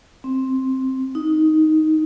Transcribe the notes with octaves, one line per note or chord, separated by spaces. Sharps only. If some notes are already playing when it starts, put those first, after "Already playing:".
C4
D#4